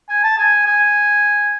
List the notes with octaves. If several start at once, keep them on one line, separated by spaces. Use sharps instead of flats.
G#5
A5
G#5
G#5